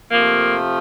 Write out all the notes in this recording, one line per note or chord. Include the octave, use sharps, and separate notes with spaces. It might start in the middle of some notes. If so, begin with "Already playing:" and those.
C3 F3 A3 A#3